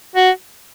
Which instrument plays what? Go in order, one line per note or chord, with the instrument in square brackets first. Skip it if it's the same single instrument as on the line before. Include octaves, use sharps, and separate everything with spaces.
[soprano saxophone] F#4